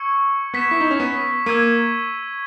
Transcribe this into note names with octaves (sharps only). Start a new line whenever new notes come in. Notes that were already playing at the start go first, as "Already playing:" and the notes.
Already playing: C#6 E6 G#6 C#7
B3 G#6 B6 E7
E4
D#4
C#4
B3
A#3 E6 G#6 D#7